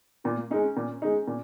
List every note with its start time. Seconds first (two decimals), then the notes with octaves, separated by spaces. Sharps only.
0.24 A#2 F4
0.37 A#3
0.50 G#3 C#4 D#4
0.63 C#4
0.77 A#2
1.02 G#3 D#4
1.28 A#2